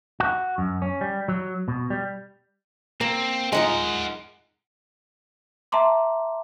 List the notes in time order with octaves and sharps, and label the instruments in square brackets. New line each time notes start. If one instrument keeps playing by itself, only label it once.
[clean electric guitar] F#4
F#2
C#4
G3
F#3
B2
G3
[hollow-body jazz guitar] A#3 [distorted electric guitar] C4
[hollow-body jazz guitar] G#3 D#4 F4 [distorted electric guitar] A#4 F#5
[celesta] E5 A5 A#5 C6 D6